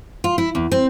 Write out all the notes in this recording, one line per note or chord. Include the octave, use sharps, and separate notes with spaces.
F4
E4
E2
C4